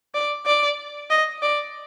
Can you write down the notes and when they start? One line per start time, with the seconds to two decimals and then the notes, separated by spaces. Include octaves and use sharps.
0.14 D5
0.46 D5
1.10 D#5
1.43 D5